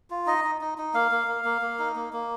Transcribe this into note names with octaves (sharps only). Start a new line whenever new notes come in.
F4
D#4 D#5
D#4
D#4
D#4
A#3 F5
A#3
A#3
A#3
A#3
D#4
A#3
A#3